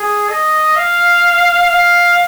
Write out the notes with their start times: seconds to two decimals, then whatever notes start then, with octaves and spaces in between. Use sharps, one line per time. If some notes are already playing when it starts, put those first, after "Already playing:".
Already playing: G#4
0.30 D#5
0.76 F5
1.72 F5